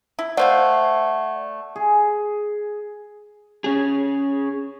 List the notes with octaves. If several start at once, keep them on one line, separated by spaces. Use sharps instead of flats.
E4
A3 C5 D5 F5 F#5
G#4
C#4 G#4